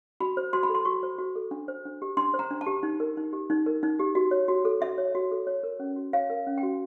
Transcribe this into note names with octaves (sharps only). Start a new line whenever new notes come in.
F#4 B5
C5
F#4 C6
B5
A4
C6
F#4 C#6
C5
F#4
A4
D4
C5
D4
G4
D4 C6
C5
A#5
D4
A5
G4
D#4
A#4
D#4
G4
D#4
A#4
D#4
G4
F#4
C#5
F#4
A4
F#4 E5
C#5
F#4
A4
C#5
A#4
C#4
F#4
C#5 F5
A#4
C#4
G5
F#4